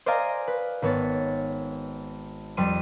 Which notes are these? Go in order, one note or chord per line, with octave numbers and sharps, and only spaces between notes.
C5 D5 D#5 F5 G#5 A#5
B4
G#1 B3 C#5 A6
F2 G3 C6 D#7